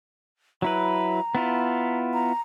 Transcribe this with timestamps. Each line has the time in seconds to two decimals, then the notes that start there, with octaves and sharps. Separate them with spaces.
0.62 F#3 E4 B4 A#5
1.35 B3 E4 F4
2.14 A#5